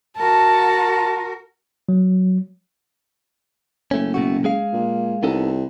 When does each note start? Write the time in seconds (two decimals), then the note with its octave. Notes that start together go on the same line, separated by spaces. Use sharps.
0.18 F#4 A#4 A5
1.89 F#3
3.91 F#1 A3 C#4
4.14 B2 A3 F#4
4.44 G#3 G#4 F5
4.73 A#2
5.23 C2 B3 D#4 A4